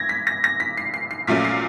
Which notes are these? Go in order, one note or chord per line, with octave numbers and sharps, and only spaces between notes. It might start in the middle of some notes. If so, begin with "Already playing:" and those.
Already playing: G#6 A#6
B6
A#6
A#6
B6
C7
C7
C7
A#1 A#2 F#3 A3 C#4 B6
C7